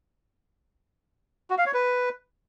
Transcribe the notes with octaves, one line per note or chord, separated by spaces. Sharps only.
F#4
F5
C#5
B4